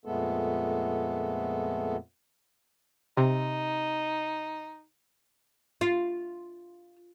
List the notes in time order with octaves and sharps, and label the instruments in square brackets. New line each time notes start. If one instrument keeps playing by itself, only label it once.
[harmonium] F2 A#2 G#3 A3 B3 A4
[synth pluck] C3 [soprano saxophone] D#4
[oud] F4